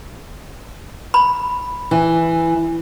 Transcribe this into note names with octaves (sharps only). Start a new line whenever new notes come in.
B5
E3